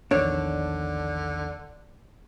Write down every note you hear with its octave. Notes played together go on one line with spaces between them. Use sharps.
A#1 E2 D3 D#3 D4 C#5